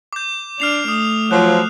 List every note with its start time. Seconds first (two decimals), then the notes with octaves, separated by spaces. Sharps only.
0.13 D6 G6
0.60 D4 F6 C7 F7
0.88 A3 D#6
1.31 F3 F#3 F#6